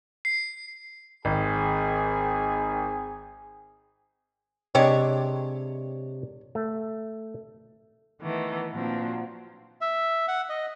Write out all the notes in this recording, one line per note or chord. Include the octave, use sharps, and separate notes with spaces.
C7
G#1 C4 G#4 G#5
C3 G#3 D4 G4 C#5
A3
D#3 E3 A3 B3
A#2 F3 F#3 C4 D4
E5
F#5
D#5